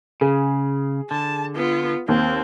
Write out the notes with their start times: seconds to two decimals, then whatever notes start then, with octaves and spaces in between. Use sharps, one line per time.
0.21 C#3 G#4
1.11 D3 A5
1.56 B3 F4
2.08 D#2 C4